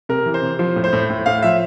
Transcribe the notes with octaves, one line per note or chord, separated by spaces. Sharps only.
C3 A#4
E3
C5
C3
F3 C5
A2
C5
A2
A2
A2 F5
F3 E5